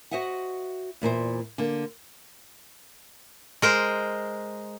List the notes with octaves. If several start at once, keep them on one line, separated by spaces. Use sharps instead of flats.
F#4 C5 D#5 E5 F#5
E2 A#2 A4 C5
D3 A#3
G#3 A#4 C5